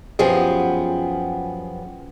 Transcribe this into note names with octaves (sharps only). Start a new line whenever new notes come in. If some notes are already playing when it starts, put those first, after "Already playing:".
F#2 F3 B3 G4 G#4